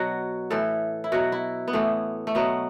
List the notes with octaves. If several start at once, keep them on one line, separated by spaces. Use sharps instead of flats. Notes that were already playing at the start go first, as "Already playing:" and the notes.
Already playing: B2 F#3 F#4
A2 E3 A4
E4
B2 F#3 F#4
E4
B3
A2 E3 A3
A3
B2 F#3 B3